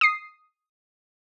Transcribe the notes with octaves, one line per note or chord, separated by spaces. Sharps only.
D#6 C7